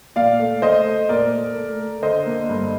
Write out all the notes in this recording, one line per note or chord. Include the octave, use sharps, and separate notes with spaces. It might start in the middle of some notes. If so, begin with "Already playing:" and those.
A#2 D5 F5
A3
A3 C5 D#5
A3
A#2 A#4 D5
A3
A3
A3
D3 C5 D#5
A#3
G2